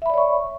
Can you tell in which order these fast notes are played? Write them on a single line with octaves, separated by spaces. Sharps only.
E5 B5 D5 C#5 C#6